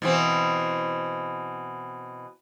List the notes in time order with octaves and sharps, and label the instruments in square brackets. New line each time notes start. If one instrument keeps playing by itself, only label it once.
[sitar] B2 E3 C4